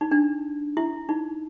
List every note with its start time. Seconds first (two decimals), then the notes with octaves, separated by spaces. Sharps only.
0.01 D#4
0.11 D4
0.77 E4
1.09 D#4